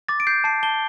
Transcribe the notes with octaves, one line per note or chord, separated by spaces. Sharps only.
D6 A6
D7
G6 C7
A5 C7
A5 G7